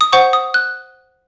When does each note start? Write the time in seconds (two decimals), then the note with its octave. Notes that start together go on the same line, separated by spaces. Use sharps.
0.01 D#6
0.13 C5 F#5 C#6
0.33 D#6
0.54 F#6